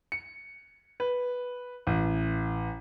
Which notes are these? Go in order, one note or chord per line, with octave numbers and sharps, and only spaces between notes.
C#7
B4
A1